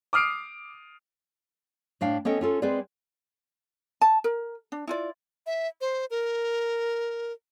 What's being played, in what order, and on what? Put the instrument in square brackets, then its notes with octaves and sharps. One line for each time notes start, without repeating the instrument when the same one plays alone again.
[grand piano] D6 D#6 F6 C7 D7
[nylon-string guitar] A2 D4 F5 G5
B3 C#4 A4 D#5 G5
C#4 F4 A4
G#3 C4 G#4 B4 D5
[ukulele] A5
A#4
D4
E4 F4 D5
[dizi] E5
C5
A#4